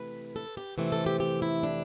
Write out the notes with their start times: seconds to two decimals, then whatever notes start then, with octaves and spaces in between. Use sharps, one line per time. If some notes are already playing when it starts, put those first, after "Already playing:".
Already playing: C3 E3 A3 B4
0.36 A4
0.57 G4
0.78 F2 C3 E3 A3 C4 G4
0.92 A4
1.06 G4
1.20 G4
1.42 E4
1.63 D4